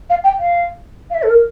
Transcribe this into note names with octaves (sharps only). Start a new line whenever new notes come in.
F5
G5
F5
F5
E5
A4
A#4